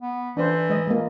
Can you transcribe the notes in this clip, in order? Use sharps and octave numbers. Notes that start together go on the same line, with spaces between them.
B3
E3 D4 C5
G#3 D#5
G#3 A#3